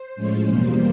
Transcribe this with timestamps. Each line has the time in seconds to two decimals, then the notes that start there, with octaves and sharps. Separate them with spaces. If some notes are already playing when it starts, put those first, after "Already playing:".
Already playing: C5
0.16 A2 F3 G#3 C#4
0.46 E2 B2 G3 A#3